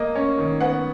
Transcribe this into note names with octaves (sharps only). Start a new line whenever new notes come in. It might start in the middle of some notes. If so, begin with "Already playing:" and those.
Already playing: A#3 D#5
C#4
D#3
B3 F#5